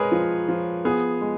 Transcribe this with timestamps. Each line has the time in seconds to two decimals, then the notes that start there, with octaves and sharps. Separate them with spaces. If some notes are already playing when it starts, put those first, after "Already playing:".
Already playing: G#3 G#4 A#4 B4 C#5
0.12 F3
0.48 F3
0.85 B3 G#4
1.21 G#3